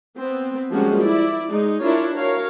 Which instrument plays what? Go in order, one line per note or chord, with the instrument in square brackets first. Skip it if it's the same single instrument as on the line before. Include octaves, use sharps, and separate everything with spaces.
[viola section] B3 C4
F3 G3 G#3 A#3 C#4 F#4
E4 D5
G#3 D#4
D4 E4 F4 A#4 C#5
F#4 A#4 C#5 F5